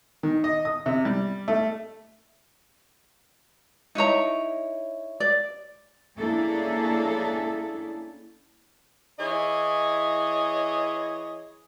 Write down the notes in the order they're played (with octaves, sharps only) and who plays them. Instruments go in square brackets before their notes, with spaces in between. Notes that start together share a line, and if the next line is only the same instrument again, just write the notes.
[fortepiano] D#3
D#5
D#6
C3
G3
A3
[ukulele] D#4 E4 C#5 A#5
D5
[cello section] A#3 C#4 D4 E4 G#4 A4
[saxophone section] E3 E4 G#4 C#5 D#5